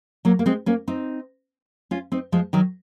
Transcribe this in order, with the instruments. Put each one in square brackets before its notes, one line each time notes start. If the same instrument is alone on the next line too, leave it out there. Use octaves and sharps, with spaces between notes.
[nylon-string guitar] F#3 A#3
A#3
G#3 C4
A#3 C#4
C4 D#4
C#4 F4
C4 D#4
F3 G#3
D#3 F#3